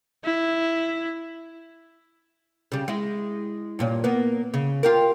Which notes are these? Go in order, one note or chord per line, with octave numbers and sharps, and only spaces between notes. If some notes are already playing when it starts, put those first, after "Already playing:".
E4
C#3 G3
G#3 E4
G2 A#2 C#4
A#3 B3
C#3
F4 G4 A#4